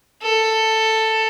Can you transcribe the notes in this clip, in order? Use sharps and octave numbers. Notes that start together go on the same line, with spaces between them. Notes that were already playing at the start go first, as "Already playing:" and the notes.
A4